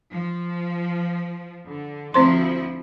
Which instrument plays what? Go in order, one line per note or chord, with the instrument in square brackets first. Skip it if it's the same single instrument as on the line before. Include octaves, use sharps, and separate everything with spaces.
[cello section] F3
D3
[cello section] D2 F3 E4 [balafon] C4 C5 C6